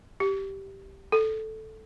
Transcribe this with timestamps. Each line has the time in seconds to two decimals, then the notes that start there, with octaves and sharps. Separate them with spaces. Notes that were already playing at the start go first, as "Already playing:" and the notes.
0.20 G4
1.12 A4